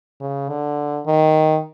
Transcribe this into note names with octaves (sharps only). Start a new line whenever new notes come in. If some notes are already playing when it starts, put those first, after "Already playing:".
C#3
D3
D#3